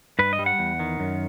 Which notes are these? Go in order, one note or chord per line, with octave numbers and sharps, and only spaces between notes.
G2 B4
D#5
G3
F#5
E2
D#3
F#2